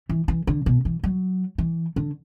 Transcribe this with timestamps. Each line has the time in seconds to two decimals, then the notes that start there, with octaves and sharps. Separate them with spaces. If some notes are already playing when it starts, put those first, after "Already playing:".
0.09 E3
0.28 E3
0.47 D3
0.66 B2
0.85 E3
1.03 F#3
1.58 E3
1.96 D3